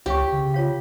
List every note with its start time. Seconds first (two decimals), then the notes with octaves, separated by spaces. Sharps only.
0.06 C#2 G4 C#5 F5 C#6
0.32 C#3
0.54 F4 C#5 F5